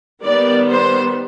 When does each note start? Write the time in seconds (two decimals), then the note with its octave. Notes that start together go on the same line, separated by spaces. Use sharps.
0.23 D#3 G3 B3 D5
0.68 C5